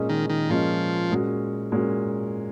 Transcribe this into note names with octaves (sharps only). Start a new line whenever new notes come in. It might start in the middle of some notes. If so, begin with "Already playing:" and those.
Already playing: A#2 G#3 C#4 G#4 D#5
D#3
D#3
A#2 F3 G#3 C#4 G#4 D#5
A#2 G#3 C#4 F#4
A#2 G#3 C#4 F#4